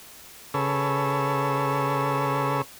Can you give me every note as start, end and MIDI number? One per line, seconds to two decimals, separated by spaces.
0.54 2.62 49
0.54 2.62 68
0.54 2.62 69
0.54 2.62 71
0.54 2.62 73
0.54 2.62 88